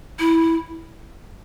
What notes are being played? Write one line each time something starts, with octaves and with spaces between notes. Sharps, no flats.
E4